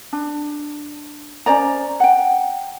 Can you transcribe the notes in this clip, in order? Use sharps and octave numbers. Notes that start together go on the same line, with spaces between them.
D4
C#4 C5 D5 A#5
F#5 G5